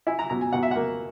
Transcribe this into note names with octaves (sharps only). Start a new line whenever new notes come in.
E4 G#5
A#5
B2 A#5
G#5
B2 F#5
E5
A#3 F#5